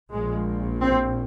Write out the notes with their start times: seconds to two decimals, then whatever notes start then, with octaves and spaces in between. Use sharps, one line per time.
0.12 A#1 A#2 G#3
0.83 C4